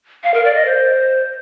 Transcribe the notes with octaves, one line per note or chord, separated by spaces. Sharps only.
F5
A#4
D5
D#5
C5